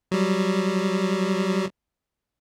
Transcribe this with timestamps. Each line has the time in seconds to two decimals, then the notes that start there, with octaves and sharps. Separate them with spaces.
0.11 F#3 G3